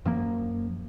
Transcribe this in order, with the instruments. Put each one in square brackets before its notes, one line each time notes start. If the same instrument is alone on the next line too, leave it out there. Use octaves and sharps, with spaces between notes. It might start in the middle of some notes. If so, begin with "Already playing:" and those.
[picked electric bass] F#2 F3 A#3